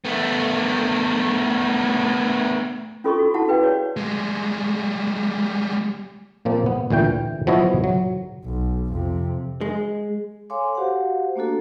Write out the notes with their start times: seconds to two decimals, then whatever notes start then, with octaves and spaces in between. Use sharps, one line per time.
0.05 A3 B3
3.04 C#4 F4 A4 D#5 C6 C#6
3.19 F#4
3.34 E4 F#4 F#5 A5
3.48 G#4 B4 F5 G5
3.62 C#5 D5
3.97 G3 G#3
6.45 A#2 F3 A#3 C4
6.66 B3
6.90 D2 A#2 E3 G5
7.47 F3 F#3 B3 E4 C#5 D#5
7.84 F#3
8.44 B1
8.91 F2 C3
9.61 G#3
10.50 A4 C#5 F5 G#5 C6 D6
10.75 F#4 G4 C5 F5 F#5
11.36 A3 A#3 D4 F#4 A4